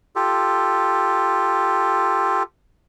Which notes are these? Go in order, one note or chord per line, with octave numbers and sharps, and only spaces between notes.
F4 G4 A4